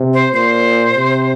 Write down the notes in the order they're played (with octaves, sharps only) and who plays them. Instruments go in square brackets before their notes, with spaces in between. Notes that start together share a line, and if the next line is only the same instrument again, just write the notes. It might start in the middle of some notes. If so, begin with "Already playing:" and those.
Already playing: [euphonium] C3
[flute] C5
[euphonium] A#2 [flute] C5
[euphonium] C3